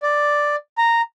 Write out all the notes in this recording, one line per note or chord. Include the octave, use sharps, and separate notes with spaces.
D5
A#5